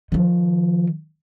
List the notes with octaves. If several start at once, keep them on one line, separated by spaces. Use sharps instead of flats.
D#3 F3